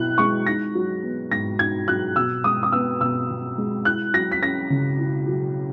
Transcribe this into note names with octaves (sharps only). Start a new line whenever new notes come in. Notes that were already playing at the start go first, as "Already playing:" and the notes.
Already playing: B2 E4 F#6
G#3 C#6
D#4 A#6
F#3
B3
G#2 A#6
D#4 G#6
F#3 F#6
B2 E6
G#3 D#6
D#6
B3 E6
B2 E6
B2
G#3
E4 F#6
F#3 A#6
B6
C#4 A#6
C#3
E4
F#3